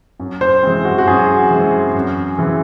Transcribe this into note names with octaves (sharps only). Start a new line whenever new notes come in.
F#2
C5
E3 G#3 C4
F#4
F#4
F#2 G#4
E3 G#3 C4
F#2
C#3 E3 C4